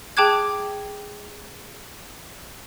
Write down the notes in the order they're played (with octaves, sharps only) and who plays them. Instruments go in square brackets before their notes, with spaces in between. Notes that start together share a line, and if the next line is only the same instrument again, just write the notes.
[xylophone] G#4 G5 A5 D6 F#6 G#6